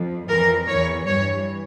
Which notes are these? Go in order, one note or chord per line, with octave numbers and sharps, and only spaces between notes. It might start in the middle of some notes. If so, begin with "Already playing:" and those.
Already playing: F2
F2 E3 A#4
E2 E3 C#5
G2 C#5
E3